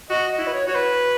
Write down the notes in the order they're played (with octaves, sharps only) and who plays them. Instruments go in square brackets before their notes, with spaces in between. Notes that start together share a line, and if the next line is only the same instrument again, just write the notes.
[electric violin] F#4 [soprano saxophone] D#5
[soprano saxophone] D#5
[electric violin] E4
[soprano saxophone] B4
C#5
[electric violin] F#4 [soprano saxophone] C#5
[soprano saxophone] B4